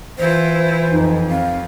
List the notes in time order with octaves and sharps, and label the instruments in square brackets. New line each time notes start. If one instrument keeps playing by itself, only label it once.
[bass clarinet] E3 [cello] E4 F4 [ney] C5
[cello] F2 [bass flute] D#4
[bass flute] C4 [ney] F5